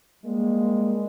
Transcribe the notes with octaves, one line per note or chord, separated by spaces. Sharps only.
G3 G#3 A#3